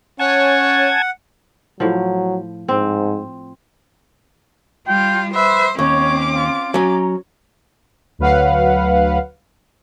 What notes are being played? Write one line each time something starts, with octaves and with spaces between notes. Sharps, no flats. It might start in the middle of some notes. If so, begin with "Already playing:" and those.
C#4 C#5 F#5 G#5 A5 G#6
A2 F3 F#3
G#2 C4
G3 F4 G5
B4 C5 E5
D#2 C4 C#4 C#5 D6
F4
F#3 C#4 A#5
D2 F#3 B4 F5 F#5